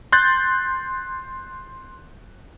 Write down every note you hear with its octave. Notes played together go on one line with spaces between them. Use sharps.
C6 F#6 G6 A6